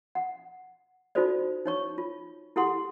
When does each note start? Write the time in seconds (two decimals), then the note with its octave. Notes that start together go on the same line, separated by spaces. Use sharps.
0.15 F#5
1.15 D#4 F4 F#4 A4 C5 D5
1.66 D#4 C#5 C#6
1.98 F4
2.56 E4 G4 A4 F#5 C6